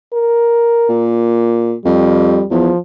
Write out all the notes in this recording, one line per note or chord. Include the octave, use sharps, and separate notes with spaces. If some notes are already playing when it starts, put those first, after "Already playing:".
A#4
A#2
F2 G3
E2 F3